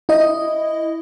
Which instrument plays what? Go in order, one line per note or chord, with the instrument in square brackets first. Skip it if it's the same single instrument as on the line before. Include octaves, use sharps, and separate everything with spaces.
[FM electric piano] E4 D#5